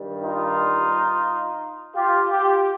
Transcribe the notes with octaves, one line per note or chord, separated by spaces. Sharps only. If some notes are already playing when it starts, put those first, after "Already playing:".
Already playing: G2 D#3 G3
D#4 F4
F4 G4
F4 G4